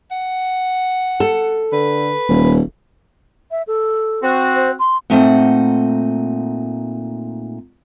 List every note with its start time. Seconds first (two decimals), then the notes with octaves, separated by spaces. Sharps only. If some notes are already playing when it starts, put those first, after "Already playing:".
0.11 F#5
1.20 A4
1.72 D3 B4
2.29 D#1
3.51 E5
3.67 A4
4.23 C4 F#4
4.55 C5
4.79 C6
5.10 A#2 A3 C4 D#4 F#5